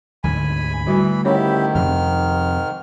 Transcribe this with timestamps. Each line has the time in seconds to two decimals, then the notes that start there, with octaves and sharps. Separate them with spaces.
0.24 D2 G#2 D3 G#5 B5
0.87 D3 E3 G3 A3 F#4
1.25 G#2 D#3 C#4 E4 G4 C#5 B5
1.75 F2 C3 F6